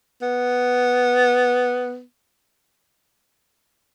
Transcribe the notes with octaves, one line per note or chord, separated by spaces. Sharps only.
B3